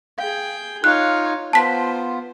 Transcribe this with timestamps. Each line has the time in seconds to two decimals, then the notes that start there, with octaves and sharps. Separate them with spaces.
0.19 G#4 F5 G5
0.84 D#4 F4 C#5 F5 F#6
1.53 B3 F4 C5 A5 B6